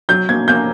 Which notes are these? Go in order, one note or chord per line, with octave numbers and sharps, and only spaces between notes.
F#3 G6
A#3 G#6
A#3 G6